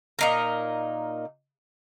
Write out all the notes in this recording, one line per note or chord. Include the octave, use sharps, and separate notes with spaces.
A#2 D#4 A#4